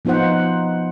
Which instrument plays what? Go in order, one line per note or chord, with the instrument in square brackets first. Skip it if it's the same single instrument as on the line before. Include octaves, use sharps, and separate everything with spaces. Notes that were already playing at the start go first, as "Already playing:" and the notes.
[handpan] F3 B3 D#4 F4 C5 F#5